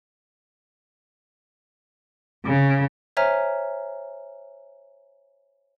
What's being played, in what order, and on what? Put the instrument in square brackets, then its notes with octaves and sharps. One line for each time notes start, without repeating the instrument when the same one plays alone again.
[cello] C#3
[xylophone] C5 C#5 E5 G#5 A#5 F6